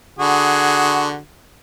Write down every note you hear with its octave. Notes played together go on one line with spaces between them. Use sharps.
D3 F#4 G#4